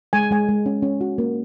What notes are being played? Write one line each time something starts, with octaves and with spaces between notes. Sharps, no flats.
G#3 G#5
G#3 G#5
G#3
C#4
C#4
F#4
A#3